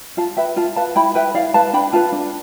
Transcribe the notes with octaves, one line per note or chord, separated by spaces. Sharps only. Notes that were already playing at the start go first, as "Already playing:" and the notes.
F4 F5 A5
B4 E5 G5
F4 F5 A5
B4 F5 A5
E4 G5 B5
B4 E5 G5
E4 D5 F5
B4 F5 A5
D4 G5 B5
F4 B4 F5 A5
D4